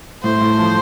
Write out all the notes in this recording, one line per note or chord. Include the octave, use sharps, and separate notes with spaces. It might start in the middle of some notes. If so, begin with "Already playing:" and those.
A2 C5
A2
F3